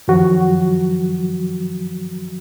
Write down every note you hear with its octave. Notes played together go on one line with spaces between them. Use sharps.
F#2 D#3 F3 F#3 F#4